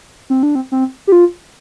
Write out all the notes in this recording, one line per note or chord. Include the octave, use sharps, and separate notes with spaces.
C4
D4
C4
C4
G4
F4